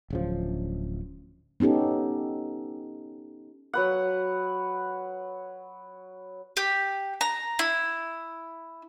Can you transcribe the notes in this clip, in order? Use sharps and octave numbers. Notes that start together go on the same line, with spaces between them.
D1 C#3 F3
B3 C#4 D#4 G4 A4
F#3 B4 F#5
G4
A#5
E4